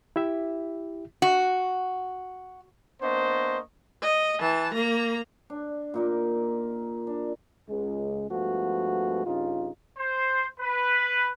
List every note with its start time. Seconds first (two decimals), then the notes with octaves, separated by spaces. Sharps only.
0.16 E4 G4 E5
1.22 F#4
3.02 A#3 B3 D4 C5 D#5 C#6
4.02 D#5
4.40 E3 A5
4.74 A#3 A#5
5.50 D4
5.94 A#2 D#4 A#4
7.07 D4
7.69 C#2 G#3
8.30 G2 F3 G#3 A3 B3 F#4
9.25 G2 C#3 D#4 F4
9.98 C5
10.60 B4